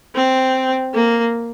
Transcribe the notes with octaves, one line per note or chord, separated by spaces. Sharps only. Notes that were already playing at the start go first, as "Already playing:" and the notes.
C4
A#3